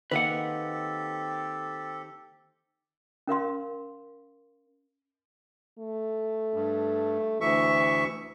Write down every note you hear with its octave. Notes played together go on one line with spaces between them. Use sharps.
D#3 A#3 C4 G4 A4 B4 F#5 C6
C#4 A#4 F5 C6
A3
G2
D2 E3 E5 C#6